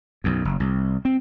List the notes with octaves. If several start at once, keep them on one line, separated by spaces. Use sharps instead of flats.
B1 F#2
F#1
C2
C4